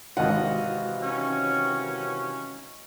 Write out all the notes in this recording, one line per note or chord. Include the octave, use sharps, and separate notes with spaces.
G#1 C3 E3 F#4 D#5 F5 F#5
D#3 C#4